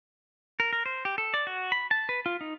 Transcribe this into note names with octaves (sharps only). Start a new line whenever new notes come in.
A#4
A#4
C5
G4
A4
D5
F#4
B5
A5
B4
F4
D#4